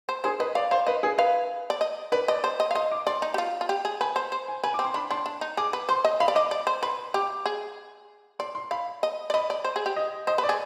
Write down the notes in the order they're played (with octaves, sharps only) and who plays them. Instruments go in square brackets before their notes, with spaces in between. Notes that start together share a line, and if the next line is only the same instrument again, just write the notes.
[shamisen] C5
[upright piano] G#4 [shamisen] C5
[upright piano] B4 [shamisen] D#5
[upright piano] D5 [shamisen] F5
[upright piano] C5 [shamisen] F5
[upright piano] B4 [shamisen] D#5
[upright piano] G#4
[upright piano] B4 [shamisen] F5
[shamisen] D5
D#5
[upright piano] B4 [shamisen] D5
[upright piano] D5 [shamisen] D#5
[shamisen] C5
D#5
F5
[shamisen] D#5 [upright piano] C6
[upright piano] D6
[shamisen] D5 [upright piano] C6
[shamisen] D#4
G4
F4
F4
G4
G#4
[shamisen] B4 [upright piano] G#5
[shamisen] C5
C5
[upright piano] G#5
[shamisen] B4 [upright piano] G#5
[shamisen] C4 [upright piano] D6
[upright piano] C6
[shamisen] D4 [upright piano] B5
[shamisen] D4 [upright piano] C6
[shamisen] D4
D#4
[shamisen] G#4 [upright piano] D6
[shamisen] B4
[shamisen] C5 [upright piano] C6
[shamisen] D#5
[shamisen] F5 [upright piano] B5
[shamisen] D5
[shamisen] D#5 [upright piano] D6
[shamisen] D5
C5
[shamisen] B4 [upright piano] C6
[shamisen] G4 [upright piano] D6
[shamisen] G#4
[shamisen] D5 [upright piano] C6
[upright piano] C6
[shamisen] F5 [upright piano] B5
[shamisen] D#5
D5
[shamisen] D#5 [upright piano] B5
[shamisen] D5
C5
G#4
G4
[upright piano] D#5
[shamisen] C5 [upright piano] D#5
[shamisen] B4
[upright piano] D5
[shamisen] G#4